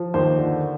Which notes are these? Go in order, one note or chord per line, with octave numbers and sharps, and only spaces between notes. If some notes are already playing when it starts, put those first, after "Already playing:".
Already playing: F3
D#2 C5
D3